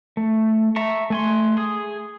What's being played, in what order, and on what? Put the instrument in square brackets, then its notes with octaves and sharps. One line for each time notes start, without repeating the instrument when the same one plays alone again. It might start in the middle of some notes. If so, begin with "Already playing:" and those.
[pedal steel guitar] A3
E5 A5 A#5 C#6
A3 G#5 C6
G#4 D#6